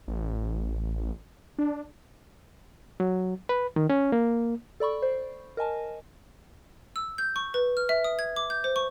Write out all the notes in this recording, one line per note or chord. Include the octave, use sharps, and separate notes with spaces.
A1
D4
F#3
B4
D#3
C#4
A#3
A4 D5 B5 C#6
C5
A#4 D#5 G#5 A5
E6
G6
C#6
B4
F6
E5
D#6
G#6
D6
G6
C5
C#6